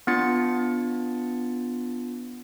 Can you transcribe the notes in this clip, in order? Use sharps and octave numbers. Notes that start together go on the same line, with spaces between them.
B3 D4 F4 A6 C#7